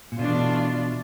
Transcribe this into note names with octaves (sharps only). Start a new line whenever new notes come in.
A#2
B2 E3 A3 D4 F4